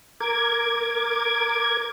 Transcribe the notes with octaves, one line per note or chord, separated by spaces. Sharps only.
A#4 D6 G#6